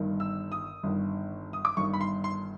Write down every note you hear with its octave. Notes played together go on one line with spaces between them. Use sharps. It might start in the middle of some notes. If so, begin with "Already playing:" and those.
Already playing: G1 G2 D#3
E6
D#6
G1 G2 D#3
D#6
D6
G1 G2 D#3 C#6
B5
C6
C6